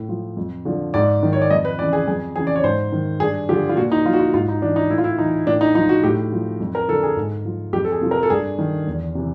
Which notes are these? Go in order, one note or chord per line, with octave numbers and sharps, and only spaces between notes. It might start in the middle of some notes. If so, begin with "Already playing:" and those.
Already playing: A2
F3
F2
D3 F3
G#2 D5
D#3
C#5
D5
F2 D#5
B4
C#3 E3 D5
G#4
F2 G#4
C#3 E3 G#4
D5
C#5
G#2 C5
D#3
G2 G#4
D3 F3 G4
F4
A#2 F#4
D#4
F3 F4
F#4
F4
G#2 F4
D#4
E3 D4
D#4
A2 E4
F4
E4
E3 D#4
A2 D4
D#4
F3 D#4
F#4
A2 G4
F3
F2
A#4
D3 F3 A4
G#4
G#2
F3
F2 G4
A4
G#4
C3 F3
A#4
A4
G2 G#4
D#3
E2
C3 E3